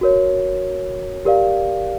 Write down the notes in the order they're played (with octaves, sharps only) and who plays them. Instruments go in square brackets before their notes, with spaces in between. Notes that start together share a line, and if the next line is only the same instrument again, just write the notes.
[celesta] F#4 A#4 C#5
G4 A#4 D5 F5